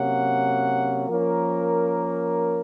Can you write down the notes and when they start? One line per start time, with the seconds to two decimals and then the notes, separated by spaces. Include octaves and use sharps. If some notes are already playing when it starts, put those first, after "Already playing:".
Already playing: C3 F#3 A#3 C#4 F#5
1.09 F3 A#3 C#4 A#4